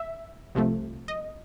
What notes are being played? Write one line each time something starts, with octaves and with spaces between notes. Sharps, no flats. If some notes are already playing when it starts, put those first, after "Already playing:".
Already playing: E5
C2 C3 F3 A3
D#5